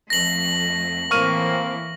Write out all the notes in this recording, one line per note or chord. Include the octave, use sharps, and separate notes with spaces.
F2 A3 A#6 F#7
A2 E3 A#3 C4 C#6 F6 D#7